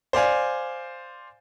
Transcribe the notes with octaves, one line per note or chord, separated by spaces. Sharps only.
C5 D5 F5 G#5